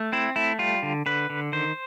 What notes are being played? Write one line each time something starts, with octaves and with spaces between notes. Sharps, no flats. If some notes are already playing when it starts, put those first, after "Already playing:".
Already playing: A3
C4 E4
A3 E4
G3 F4
D3
D3 B4
D3
D#3 C5